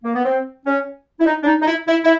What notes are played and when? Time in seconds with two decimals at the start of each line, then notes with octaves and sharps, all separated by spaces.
0.04 A#3
0.15 B3
0.25 C4
0.66 C#4
1.20 E4
1.26 D#4
1.43 D4
1.46 D#4
1.62 D#4
1.67 E4
1.88 E4
2.04 E4